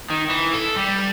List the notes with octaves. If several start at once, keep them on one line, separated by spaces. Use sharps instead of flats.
D#3
E3
A4
G3